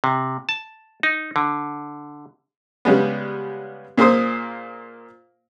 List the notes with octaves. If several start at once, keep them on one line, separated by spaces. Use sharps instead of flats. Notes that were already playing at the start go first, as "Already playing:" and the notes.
C3
A5
D#4
D3
C#3 G3 G#3 B3
A#2 A#3 G#4 C5 D#6